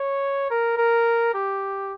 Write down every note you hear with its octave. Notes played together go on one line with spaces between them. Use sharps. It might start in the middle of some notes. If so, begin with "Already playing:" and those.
Already playing: C#5
A#4
A#4
G4